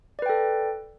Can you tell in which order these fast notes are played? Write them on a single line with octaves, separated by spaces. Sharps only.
D5 B4 G5 A4